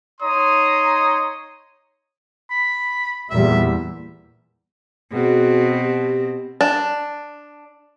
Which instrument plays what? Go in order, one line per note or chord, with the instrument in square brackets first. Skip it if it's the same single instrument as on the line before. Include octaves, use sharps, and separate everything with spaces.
[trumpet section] D#4 C#5 A#5 C6 D#6
[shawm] B5
[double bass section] E2 A#2 G3 [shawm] E5
[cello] B2 C4 [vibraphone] F#4 G#4
[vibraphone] G4
[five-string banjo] D4